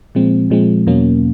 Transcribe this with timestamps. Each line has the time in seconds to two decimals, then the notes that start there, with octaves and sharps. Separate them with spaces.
0.15 A#2 F3 G#3 C4
0.50 A#2 F3 G#3 C4
0.87 E2 B2 F#3 A#3 C#4